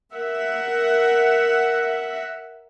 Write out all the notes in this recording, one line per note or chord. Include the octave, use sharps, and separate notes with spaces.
A#4 E5 F#5